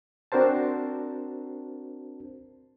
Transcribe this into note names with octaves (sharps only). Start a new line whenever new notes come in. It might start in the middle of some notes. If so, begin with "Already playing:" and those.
C4 D4 F#4 A#4 C5 A5